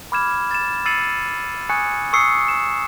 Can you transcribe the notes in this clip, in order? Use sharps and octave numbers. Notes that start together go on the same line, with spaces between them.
B5 D6 F6 G#6 E7
A6 E7
E6 A6 C7 C#7 D#7 F#7
G#5 C#6 D#6 F#6 G#6 C#7
C#6 D#6 E6 C7 C#7
E7